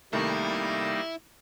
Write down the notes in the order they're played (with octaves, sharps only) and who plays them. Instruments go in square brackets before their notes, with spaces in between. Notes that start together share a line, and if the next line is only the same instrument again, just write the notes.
[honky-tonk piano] C2 D#3 A3 [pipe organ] G3 A#3 D#4 [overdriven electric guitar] E4